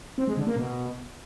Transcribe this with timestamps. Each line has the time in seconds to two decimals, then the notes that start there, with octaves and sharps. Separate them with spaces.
0.18 C4
0.27 G#3
0.37 D3
0.47 A#3
0.56 B2